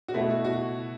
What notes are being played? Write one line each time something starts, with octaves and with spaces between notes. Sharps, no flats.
F#4
B2 A3 E4
F#4
F#4